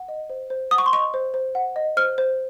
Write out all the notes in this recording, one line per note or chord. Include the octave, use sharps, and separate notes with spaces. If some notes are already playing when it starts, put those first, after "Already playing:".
Already playing: F#5
D#5
C5
C5
F#5 D#6
C#6
C6
D#5 C#6
C5
C5
F#5
D#5
C5 F6
C5